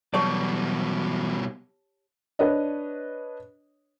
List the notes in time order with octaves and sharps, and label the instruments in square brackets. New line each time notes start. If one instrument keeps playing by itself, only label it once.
[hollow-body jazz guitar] E2 F#3 D5 [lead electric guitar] B2 G3 [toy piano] G4 C#5 A5
[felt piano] D4 B4 C#5 D#5